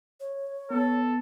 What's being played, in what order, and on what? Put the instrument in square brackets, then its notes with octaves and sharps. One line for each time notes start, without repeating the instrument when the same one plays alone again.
[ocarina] C#5
[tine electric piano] B3 [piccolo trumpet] A4